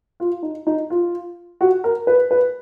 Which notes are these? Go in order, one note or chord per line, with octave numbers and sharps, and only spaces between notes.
F4
D#4
D#4
F4
F#4
A#4
B4
B4